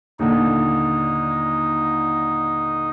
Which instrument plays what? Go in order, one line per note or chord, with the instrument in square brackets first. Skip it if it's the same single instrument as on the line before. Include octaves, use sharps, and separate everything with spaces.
[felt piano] D#2 A#2 D3 [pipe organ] D#4